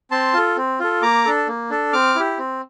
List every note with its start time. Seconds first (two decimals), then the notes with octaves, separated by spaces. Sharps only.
0.11 C4 A5 C6
0.33 F4 A4
0.57 C4
0.80 F4 A4
1.02 A#3 A#5 D6
1.25 D4 A4
1.48 A#3
1.70 D4 A4
1.93 C4 D6 F6
2.16 E4 G4
2.39 C4